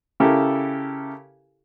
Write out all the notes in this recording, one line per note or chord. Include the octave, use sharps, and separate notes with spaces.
C#3 E4 G4 A4 A#4